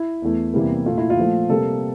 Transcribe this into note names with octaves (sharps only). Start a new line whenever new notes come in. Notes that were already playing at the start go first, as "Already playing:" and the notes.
Already playing: E4
E2 E3 A3
E2 C3 E3 G3 A#3
A#2 A3 F4
E4
F4
A#2 F3 A3
C3 G3 A#3 A4